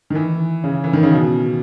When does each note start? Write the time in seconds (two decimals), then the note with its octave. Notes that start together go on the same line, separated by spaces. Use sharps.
0.10 D#3
0.15 E3
0.64 C#3
0.84 E3
0.93 D#3
1.03 C#3
1.12 B2